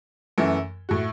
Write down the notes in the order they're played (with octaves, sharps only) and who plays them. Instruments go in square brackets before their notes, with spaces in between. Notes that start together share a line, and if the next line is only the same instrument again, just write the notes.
[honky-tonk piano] F#2 E3 A3
A2 A3 F#4